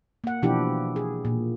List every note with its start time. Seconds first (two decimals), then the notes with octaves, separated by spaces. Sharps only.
0.24 A#3 F#5
0.42 B2 E3 F3 D4 E4 G4
0.96 G#4
1.25 A#2